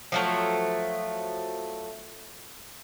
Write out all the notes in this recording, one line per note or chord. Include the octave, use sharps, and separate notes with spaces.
F3 F#3 A3